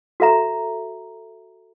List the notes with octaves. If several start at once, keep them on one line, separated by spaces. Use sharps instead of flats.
F#4 A4 E5 A#5